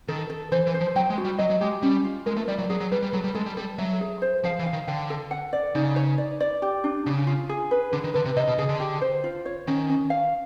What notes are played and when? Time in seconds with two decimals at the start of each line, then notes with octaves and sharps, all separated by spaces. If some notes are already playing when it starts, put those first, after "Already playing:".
0.08 D#3 A4
0.30 A4
0.52 E3 C5
0.67 E3
0.74 C5
0.81 F3
0.96 F#3 G5
1.10 G#3
1.18 F#4
1.24 G3
1.38 F#3 D#5
1.50 F#3
1.61 G#3 G4
1.82 G3 C#4
2.04 F4
2.26 G#3 A#4
2.37 A3
2.48 G3 D5
2.59 F#3
2.70 F#3 G#4
2.80 F#3
2.91 G3 B4
3.02 G3
3.13 F#3 A4
3.24 G3
3.35 G#3 A4
3.46 G3
3.57 G3 A4
3.78 F#3 E5
4.01 G#4
4.22 C5
4.44 F3 F5
4.59 E3
4.66 F5
4.73 D#3
4.87 D3 G5
5.10 A4
5.31 F#5
5.53 D5
5.75 C#3 D#4
5.96 C#5
6.18 D5
6.40 D5
6.62 G4
6.84 D4
7.06 C#3 D4
7.27 F4
7.49 G#4
7.71 B4
7.93 D3 D4
8.04 D#3
8.14 D3 B4
8.25 C3
8.36 C3 D#5
8.47 B2
8.58 C#3 G#4
8.69 D3
8.80 G4
9.01 C5
9.24 F4
9.46 C#5
9.67 D#3 C#4
9.89 C#4
10.10 F5